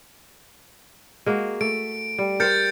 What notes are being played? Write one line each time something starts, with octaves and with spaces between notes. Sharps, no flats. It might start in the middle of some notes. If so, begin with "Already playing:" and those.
G#3 A#3 F#4
A3 D7
G3
A#4 C5 G5 G6 A6 C#7